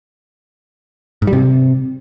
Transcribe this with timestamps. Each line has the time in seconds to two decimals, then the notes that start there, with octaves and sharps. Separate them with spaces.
1.22 G#2
1.27 G3
1.33 C3